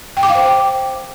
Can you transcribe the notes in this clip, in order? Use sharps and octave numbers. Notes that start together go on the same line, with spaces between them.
G5
D6
F5
C5
G5